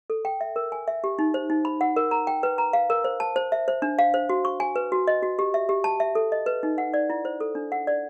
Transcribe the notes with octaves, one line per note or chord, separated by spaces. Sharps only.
A4
G5
E5
A#4
G#5
E5
G4
D#4
C5
D#4
B5
F#5
A#4
A#5
G5
B4
A#5
F5
A#4
C5
A5
C5
E5
C5
D4
F5
C5
F#4
C#6
G#5
B4
F#4
D#5
F#4
G4
E5
G4
A5
E5
A4
D#5
B4
D#4
F#5
D5
E4
C5
A4
D4
F#5
D5